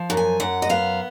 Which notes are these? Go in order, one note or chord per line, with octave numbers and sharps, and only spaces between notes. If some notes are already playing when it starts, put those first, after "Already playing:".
Already playing: F3
F#2
G#5
F#2 F#5
D#5
B3 F5